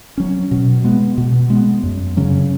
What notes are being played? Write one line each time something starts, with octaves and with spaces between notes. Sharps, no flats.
F#3 C#4
B2
G#3 B3
B2
G#3 B3
F#2
C#3 F#3 C#4